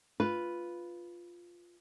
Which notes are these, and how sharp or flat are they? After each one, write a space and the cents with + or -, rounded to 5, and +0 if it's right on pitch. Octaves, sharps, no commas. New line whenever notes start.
F4 +0 B4 +0